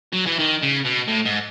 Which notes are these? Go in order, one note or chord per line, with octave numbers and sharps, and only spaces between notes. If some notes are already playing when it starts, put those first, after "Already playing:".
F#3
E3
D#3
C#3
B2
A2
G#2